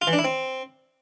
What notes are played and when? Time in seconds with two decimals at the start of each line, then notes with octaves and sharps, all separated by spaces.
0.02 F4
0.07 E3
0.13 D4
0.19 E4
0.24 C4